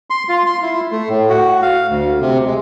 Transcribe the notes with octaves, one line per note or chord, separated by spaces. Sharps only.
C6
F4
C6
E4
A3
A2
F#4
F5
D2
C3
G#3